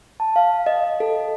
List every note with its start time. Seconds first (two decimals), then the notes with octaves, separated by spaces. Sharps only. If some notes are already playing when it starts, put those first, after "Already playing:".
0.20 A5
0.36 F5
0.66 D#5
0.84 D#5
1.00 A4